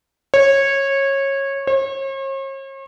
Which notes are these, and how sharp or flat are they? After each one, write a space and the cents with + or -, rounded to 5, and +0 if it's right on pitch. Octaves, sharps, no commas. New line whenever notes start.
C#5 -20
C#5 -45